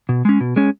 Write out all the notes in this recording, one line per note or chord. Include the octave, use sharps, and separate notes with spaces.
B2
G#3 C#4
B2
G#3 C#4